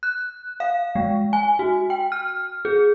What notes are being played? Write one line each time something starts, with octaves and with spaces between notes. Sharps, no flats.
F#6
F5
G#3
G#5
F#4
G5
F6
G#4